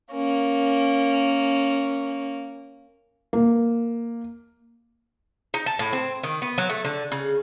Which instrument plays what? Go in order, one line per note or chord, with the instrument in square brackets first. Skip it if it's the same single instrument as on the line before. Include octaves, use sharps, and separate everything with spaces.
[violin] A#3 C#4
[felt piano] A#3
[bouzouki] D#4
A5
A2
C4
D#3
B3
F#3
A3
D3
C#3